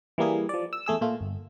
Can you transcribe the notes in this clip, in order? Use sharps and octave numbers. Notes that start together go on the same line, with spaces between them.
E3 G3 A#3 G#4
F3 D5
E6
E2 A3 G#4 E6
A#2 A3 F4
G1